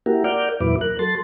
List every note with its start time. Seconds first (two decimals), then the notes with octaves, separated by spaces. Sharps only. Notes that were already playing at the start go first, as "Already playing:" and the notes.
0.06 A#3 E4 F#4 G4 A#4
0.24 A#4 D5 F#5 D6 F6 G6
0.60 E2 A#2 F#3 E4 B4 D6
0.81 A#4 F#6
0.99 F#3 A4 C6 A6